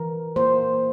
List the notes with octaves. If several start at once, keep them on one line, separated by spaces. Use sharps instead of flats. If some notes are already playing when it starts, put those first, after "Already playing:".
Already playing: E3 A#4
A#3 C5